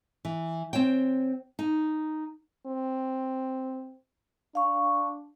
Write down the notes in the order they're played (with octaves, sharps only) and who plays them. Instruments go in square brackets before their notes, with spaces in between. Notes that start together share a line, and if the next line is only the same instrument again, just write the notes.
[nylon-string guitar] E3
C4 C5 C#5 G5
D#4
[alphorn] C4
[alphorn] D4 [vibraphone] F5 C#6